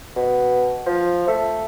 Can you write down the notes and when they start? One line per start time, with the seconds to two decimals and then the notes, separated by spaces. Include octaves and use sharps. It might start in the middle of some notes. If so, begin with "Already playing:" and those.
0.16 B2
0.86 F3
1.28 A3